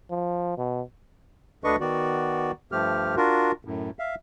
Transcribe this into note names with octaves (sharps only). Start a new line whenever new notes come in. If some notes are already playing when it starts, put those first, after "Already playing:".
F3
B2
D2 D3 D4 B4 D#5 C#6
D#3 B3 F#4 D5
G2 F3 A3 G4 F6
D4 F4 F#4 A#4
F#2 A2
E5 F5